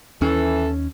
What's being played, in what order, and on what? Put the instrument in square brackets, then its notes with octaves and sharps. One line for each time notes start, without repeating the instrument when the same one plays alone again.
[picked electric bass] D#2 C#4 [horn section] E3 A4